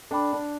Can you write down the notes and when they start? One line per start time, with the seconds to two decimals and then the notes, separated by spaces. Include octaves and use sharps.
0.11 D4 A4 D5 G5 B5 D6
0.33 D4